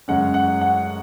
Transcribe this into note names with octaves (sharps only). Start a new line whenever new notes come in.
F#2 C#3 G#3 C#4 F#5
F#5
F#5